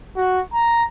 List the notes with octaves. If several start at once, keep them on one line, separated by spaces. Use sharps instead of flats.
F#4
A#5